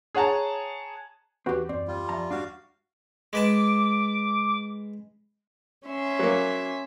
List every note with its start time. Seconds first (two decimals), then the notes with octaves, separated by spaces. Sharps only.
0.15 G#4 C#5 F#5 A5 A#5
1.46 D#2 E3 C4 F#4 G4 B4
1.69 F#2 C4 D5
1.88 G3 F4
2.09 F2 E5 A5 A#5
2.31 G#2 G3 D4 F#4 F5
3.33 G#3 B4 A5 D6
5.88 C#4 E5 C6
6.19 F#3 A#3